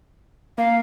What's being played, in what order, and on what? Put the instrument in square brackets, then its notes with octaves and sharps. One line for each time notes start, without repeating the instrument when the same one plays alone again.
[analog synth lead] A#3 [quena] F5